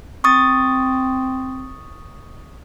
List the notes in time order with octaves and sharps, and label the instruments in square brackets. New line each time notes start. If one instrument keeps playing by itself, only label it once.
[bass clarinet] C4 [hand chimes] C#6 D#6 A6